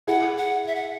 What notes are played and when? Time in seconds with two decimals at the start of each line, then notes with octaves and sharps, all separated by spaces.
0.07 E4 G#4 F#5
0.37 F#5
0.67 E5
0.75 F#5